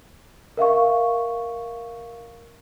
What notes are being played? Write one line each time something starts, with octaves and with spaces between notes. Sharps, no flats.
A#4 E5 F5 C#6